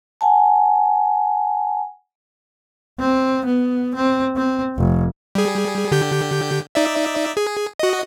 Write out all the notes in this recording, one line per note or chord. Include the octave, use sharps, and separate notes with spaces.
F#5 G#5 A5
C4
B3
C4
C4
F1
G3 G#4
D3 G4 G6
D#4 D5 E5
G#4
F#4 D#5